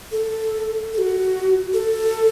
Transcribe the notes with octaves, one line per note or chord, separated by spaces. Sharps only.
A4
A4
F#4
A4